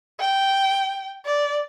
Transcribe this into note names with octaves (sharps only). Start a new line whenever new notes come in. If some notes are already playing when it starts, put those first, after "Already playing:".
G5
D5